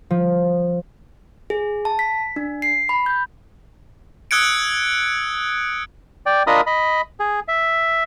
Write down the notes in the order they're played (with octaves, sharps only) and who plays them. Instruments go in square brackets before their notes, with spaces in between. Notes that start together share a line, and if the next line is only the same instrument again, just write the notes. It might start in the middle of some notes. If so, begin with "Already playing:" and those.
[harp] F3
[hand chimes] G#4
A5
B6
D4
C7
B5
G6
[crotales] D#6 E6 F#6 G#6 C#7 D7
[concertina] D5 G5
D4 F4 A#4 D#5 B5 D#6
D#5 B5
G#4
E5